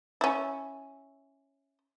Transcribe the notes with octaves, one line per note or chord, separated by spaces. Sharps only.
C#4 E4